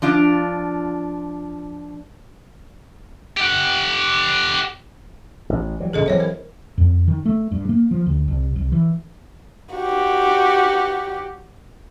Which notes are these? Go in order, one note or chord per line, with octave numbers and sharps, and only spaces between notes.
F3 D4 F4
G4 F#5
A1
E3 F#3 G3
A2 C#3 E3 G#4 A4 D#5
E3 F#3 C4 C5 C#5 E5
A#4
F2
D#3
A3
G2
A#3
F3
D2
C2
C2
E3
F#4 G4